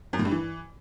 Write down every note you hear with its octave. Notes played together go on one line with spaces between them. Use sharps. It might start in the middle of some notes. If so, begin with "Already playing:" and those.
F#2
A2
G2
E3